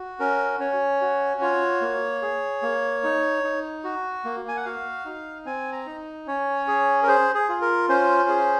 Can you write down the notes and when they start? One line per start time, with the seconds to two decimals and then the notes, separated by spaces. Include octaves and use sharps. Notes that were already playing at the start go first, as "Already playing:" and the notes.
Already playing: F#4
0.20 C#4 A#4
0.60 C#4 C#5
1.01 F#4
1.41 F4 C#5
1.81 A#3
2.22 G#4
2.62 A#3
3.04 D#4
3.43 D#4
3.84 F#4
4.25 A#3
4.48 G#5
4.57 F#5
4.65 F#4 F5
5.06 D#4
5.46 C4 G#5
5.73 A#5
5.86 D#4
6.27 C#4 C#5
6.68 G#4
7.02 A#4
7.08 G#4 C5
7.35 G#4
7.49 F4
7.62 A#4
7.89 C#4 C5
8.29 G#4